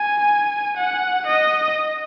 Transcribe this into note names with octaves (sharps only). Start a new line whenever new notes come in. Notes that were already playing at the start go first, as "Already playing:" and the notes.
Already playing: G#5
F#5
D#5